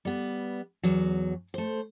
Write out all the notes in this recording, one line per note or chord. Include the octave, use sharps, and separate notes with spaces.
G3 B3
E2 F#3
A3 C5